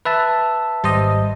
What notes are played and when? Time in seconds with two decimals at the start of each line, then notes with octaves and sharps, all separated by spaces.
0.05 B4 E5 A5
0.84 G#1 G3 C5 D#5